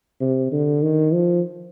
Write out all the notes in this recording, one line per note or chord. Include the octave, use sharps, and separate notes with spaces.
C3
D3
D#3
F3